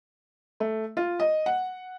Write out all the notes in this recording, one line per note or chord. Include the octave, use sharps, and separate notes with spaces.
A3
F4
D#5
F#5